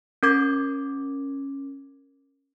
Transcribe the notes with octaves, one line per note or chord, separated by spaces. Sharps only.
C#4 A#4 D6 G#6